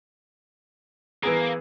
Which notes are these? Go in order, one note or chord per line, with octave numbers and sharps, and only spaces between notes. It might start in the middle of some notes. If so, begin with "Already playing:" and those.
E3 A#3 B3 G#4